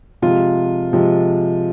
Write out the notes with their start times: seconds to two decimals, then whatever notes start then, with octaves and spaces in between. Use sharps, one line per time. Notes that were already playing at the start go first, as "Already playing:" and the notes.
0.22 C3 F3 G#3 F4
0.93 C3 F3 G#3